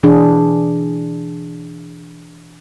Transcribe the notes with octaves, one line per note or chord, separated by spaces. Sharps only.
B2 E3 D4 G#4